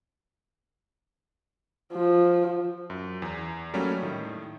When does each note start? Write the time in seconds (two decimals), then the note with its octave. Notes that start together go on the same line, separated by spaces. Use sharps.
1.93 F3
2.90 F#2
3.22 E2
3.74 F#3 G3 A3 A#3 C#4
4.02 A2 D#3